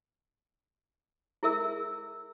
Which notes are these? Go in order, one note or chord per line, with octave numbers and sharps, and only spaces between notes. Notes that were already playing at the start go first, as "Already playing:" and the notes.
E4 G#4 A#4 E5 E6